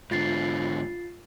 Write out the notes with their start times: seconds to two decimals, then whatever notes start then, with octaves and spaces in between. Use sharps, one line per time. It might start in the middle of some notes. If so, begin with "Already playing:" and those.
0.11 G#2 D3 F4 A6 C7